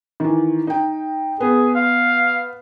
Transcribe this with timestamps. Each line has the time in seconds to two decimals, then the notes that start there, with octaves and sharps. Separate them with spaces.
0.20 D#3 E3
0.67 D#4 G5
1.40 B3 G#4
1.76 F5